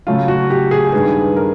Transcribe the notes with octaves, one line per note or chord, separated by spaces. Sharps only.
C#3 F#3 A3 F4
F#4
G4
G#4
G2 D#3 G3 B3 G#4
A#4